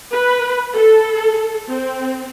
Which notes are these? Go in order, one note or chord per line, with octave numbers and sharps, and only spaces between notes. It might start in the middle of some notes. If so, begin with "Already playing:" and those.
B4
A4
C4